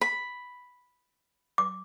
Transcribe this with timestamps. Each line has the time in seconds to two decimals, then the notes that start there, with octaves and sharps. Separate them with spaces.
0.01 B5
1.58 D6